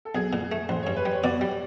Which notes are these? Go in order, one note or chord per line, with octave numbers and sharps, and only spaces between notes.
A4
B1 G#4
A#2
A3
A1 C5
G2 C#5
B4
G3
C#5
B2 D5
G3